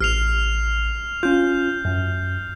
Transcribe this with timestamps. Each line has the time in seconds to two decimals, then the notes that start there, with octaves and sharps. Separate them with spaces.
0.01 A1 F6 C7 F7
1.23 C#4 F4 G6
1.85 F#2